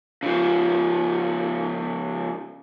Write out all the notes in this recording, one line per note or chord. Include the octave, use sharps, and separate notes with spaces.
C#3 F3